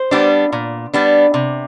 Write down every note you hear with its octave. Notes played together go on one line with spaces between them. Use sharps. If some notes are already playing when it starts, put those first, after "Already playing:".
Already playing: C5
G3 B3 D4
A#2
G3 B3 D4
C3